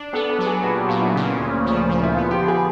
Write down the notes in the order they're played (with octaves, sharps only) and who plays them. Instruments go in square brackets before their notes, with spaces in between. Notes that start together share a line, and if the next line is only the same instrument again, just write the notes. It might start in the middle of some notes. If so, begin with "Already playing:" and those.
Already playing: [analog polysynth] D4
[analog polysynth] B3 [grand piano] A4
[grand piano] A4
[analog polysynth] F#3
[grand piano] G#4
[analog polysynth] A#2 [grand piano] F#4
[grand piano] G4
[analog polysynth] A#2 [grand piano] F4
[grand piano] E4
[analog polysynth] C#3
D2
F3
F3
[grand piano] E4
[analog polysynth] B3 [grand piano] F4
[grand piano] G4
[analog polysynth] D3
[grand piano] G#4